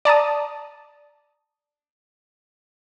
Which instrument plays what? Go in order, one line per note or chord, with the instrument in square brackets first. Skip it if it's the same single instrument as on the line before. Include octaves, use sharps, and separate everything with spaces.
[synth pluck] D5 A5 A#5 D#6